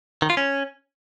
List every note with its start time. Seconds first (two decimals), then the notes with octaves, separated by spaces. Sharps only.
0.22 D#3
0.30 F4
0.37 C#4